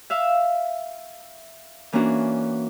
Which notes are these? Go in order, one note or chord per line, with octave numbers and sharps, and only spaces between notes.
E5 F5 E6
E3 A#3 C#4 D4 F#4